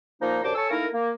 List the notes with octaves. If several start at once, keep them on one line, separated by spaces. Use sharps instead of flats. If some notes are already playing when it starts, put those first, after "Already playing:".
A#2 F3 A#3 D#4
F#2 D3 G4 C5 A5 D6
A4 C#5 G#5 A5 C#6 E6
A3 A#3 D#4 E4 A#4
A#3